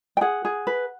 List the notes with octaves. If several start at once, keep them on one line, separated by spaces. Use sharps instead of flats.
G5
G#4 F#5
G#4
B4